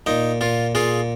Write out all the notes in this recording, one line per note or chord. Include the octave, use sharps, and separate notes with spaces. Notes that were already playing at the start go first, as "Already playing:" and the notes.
A#2 D#4
A#2 F4
A#2 F4 G#4